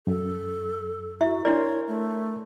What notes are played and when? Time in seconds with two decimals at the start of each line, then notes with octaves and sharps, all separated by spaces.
0.07 F#2 A4
1.21 E4 F#4 E5
1.45 D4 E4 A#4 C#5 D5 A#5 C6
1.88 A3